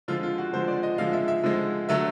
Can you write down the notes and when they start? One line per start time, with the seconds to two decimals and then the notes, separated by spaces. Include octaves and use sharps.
0.08 D3 F3 G#3 F4
0.23 F4
0.38 F#4
0.53 D3 F3 G#3 C5
0.68 D5
0.83 D#5
0.98 D3 F3 G#3 F5
1.13 E5
1.28 E5
1.43 D3 F3 G#3
1.89 D3 F#3 A3 E5